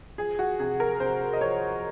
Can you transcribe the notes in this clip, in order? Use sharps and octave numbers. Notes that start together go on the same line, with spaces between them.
F3 G#4
F#4
C3 G#4
A#4
C3 C5
D#5
F3 C#5